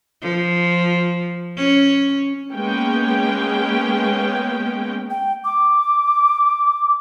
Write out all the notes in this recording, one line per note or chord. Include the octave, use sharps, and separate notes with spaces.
F3
C#4
G#3 A#3 B3 C#4 G5
G5
D6